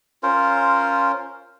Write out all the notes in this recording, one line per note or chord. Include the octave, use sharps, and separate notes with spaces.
C#4 F4 A#4 C5